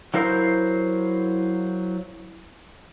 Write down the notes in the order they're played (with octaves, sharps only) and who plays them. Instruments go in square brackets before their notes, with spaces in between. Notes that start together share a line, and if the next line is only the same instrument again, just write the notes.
[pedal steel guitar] F#3 E4 A#4 C5 F5